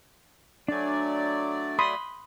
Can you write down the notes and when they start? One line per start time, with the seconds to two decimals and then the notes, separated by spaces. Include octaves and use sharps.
0.68 F#3 A3 D4 D5 G#5
1.79 B5 C6 D#6